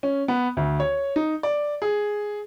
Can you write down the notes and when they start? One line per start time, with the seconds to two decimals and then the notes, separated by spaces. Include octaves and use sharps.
0.03 C#4
0.28 B3
0.57 D2
0.80 C#5
1.16 D#4
1.43 D5
1.82 G#4